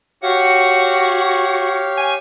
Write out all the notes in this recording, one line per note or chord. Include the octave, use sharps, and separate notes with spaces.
F#4 G4 C#5 F5
G#5